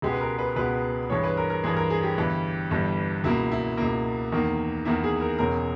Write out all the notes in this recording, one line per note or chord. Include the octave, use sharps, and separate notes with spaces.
C#2 B2 G#3 B3 G4
B4
A#4
B4
C#2 B2 G#3 B3 B4
G2 E3 G#3 C#5
B4
A#4
A#4
G2 E3 G#3 G#4
A#4
G#4
G4
G1 G2 E3 G3
G1 G2 E3 G3
C#2 B2 A#3 E4
E4
C#2 B2 A#3
E2 D#3 A#3
E2 D#3 A#3 E4
G#4
A#4
E1 E2 C#3 G#3 A#4